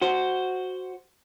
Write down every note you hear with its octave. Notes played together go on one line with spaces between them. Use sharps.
F#4 C5